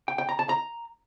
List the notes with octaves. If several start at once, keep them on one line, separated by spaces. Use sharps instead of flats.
G5
G5
A#5
A5
A#5